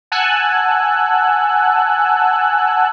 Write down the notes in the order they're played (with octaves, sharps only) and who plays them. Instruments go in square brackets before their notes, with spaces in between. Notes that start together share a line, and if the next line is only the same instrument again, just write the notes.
[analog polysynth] F#5 G#5 A5 E6 F#6